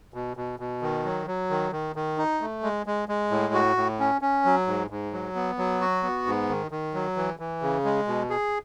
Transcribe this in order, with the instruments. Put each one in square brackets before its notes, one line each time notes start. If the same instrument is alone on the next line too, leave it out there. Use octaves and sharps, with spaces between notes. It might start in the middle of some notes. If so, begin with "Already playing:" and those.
[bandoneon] B2
B2
B2
D#3
F#3
F#3
D#3
D#3
D#3
D#4
A3
G#3
G#3
G#3
A2
F#4
A2
C#4
C#4
F#3
G#2
G#2
F#3
B3
F#3
F#4
B3
G#2
D#3
D#3
F#3
E3
E3
C#3
G#3
B2
G#4